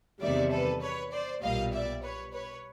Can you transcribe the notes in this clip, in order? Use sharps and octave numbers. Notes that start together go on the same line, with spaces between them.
E2 C3 D#3 G3 D5 E5
A4 B4
B4 C#5
C5 D5
B1 A#2 G3 A#3 D#5 F5
D5 E5
B4 C#5
B4 C#5